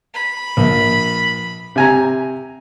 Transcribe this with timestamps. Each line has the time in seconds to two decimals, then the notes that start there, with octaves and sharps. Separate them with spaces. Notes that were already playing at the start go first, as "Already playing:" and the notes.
0.14 B5
0.57 A#1
1.76 C3 G#5 A#5